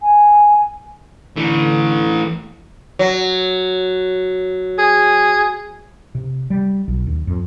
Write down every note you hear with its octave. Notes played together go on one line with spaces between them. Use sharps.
G#5
D3 E3 A3
F#3
G#4
C3
G3
B1
D#2
F2